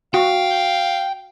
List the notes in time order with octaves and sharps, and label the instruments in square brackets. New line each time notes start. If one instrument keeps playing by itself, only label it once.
[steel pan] F#4 [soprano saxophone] F5 [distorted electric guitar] G5